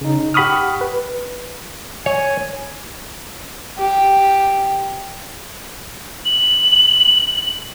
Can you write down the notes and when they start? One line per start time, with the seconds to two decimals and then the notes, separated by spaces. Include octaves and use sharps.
0.01 C#3 D#4
0.34 G4 F#5 B5 C#6 D#6 F6
0.81 B4
2.06 C#5 G#5
3.79 G4
6.25 F#7